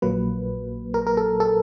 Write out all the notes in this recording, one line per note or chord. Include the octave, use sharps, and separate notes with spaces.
A#1 A#2 F#3 A#3 B4
A#4
A#4
A4
A4